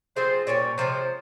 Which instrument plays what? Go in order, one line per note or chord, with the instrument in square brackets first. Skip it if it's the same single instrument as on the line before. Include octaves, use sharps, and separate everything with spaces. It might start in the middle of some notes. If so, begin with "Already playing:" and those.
[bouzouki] F3 C4 F4 G#4 [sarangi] C5
[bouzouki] A#2 G3 C#4 G4 [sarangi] C#5
[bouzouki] C3 F3 G#3 [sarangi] C5